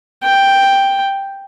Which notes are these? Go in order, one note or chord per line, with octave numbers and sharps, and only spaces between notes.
G5